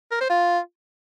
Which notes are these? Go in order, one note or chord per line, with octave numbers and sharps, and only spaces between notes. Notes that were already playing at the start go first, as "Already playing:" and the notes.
A#4
C5
F4